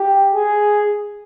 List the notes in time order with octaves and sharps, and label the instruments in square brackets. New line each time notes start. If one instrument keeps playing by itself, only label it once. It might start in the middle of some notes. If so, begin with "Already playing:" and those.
Already playing: [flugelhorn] G4
G#4